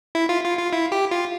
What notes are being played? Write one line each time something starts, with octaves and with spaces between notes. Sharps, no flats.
E4
F4
F4
F4
E4
G4
F4